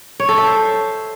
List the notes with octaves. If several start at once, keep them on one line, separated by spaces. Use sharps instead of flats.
C#5
A4
E5
C5